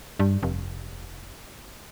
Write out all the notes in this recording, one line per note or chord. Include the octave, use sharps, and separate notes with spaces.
G2
F1